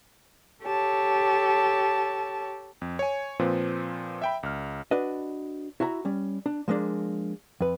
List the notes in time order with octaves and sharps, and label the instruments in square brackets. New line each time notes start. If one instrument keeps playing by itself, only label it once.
[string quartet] G4 A4 C#5 A5
[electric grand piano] F2
C#5 G#5
A#2 F3 C4 B4
E5 G5 B5
C#2 F6
[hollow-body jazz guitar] D4 F#4 B4 D#5
E4 F#4 E5 A5 A#5
G3 C#4
D4
F3 G#3 A#3 D4
F2 B4